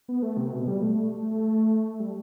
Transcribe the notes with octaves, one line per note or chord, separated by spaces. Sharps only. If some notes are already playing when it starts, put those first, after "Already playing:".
B3
A3
C3
B2
G3
A3
G3